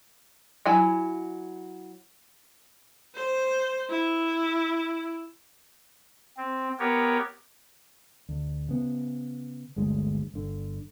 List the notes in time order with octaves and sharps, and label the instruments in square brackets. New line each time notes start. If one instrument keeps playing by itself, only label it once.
[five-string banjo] F#3 E4 G#5
[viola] C5
E4
[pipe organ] C4
B3 G4 A#4 C#5
[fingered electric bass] D2
C#3 B3
G1 D2 G#3
G1 D3